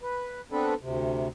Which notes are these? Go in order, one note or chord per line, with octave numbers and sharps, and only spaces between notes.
B4
B3 C4 D4 A4 B4
D2 C3